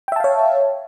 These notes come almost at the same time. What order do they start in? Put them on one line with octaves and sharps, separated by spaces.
G5 E5 A5 F5 C#5